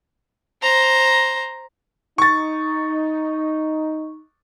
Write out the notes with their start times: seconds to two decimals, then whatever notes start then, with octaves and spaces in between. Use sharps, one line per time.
0.62 C5 A#5
2.18 D#4 C#6 A6